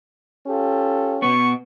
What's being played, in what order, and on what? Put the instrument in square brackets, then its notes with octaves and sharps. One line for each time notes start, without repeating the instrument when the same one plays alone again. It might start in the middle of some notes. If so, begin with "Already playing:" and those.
[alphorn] C#4 [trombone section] F4 G4 A4
[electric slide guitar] B2 B3 [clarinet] C#6